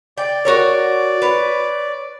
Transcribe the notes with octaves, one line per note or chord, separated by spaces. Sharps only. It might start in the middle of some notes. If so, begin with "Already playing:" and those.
D5 G5
F#4 A#4 C#5
B4 C#5